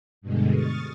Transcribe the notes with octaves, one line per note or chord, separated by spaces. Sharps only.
G2 B2 D3 G#3
C#6 D#6 F6 A6